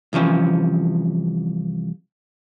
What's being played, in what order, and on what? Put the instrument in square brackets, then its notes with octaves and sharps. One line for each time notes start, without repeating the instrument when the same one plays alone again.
[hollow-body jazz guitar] C2 E3 F3 C#4